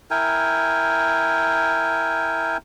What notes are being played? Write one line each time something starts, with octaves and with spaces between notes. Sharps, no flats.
E4 A#4 G5 G#5